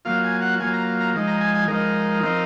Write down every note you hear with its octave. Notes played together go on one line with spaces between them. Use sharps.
F#3 A#3 F4 F5
G#5
F#5
F#3 A#3 F4 G#5
A#5
A#5
F3 G#3 D#4
A#5
G#5
G#5
F3 G#3 D#4 A#4
F3 C4 D#4